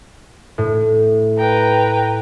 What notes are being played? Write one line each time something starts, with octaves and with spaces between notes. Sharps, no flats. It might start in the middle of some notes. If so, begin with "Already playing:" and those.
A2
B4 G5 A#5